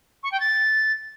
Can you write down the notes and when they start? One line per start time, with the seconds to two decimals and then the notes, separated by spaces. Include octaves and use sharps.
0.23 C#6
0.31 G5
0.40 A6